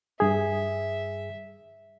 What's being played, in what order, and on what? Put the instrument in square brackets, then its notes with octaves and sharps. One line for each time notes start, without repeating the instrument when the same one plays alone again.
[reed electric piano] G2 G#4 [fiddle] E5